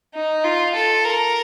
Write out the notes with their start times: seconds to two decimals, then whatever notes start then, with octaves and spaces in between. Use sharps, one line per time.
0.14 D#4
0.44 F4
0.74 A4
1.04 A#4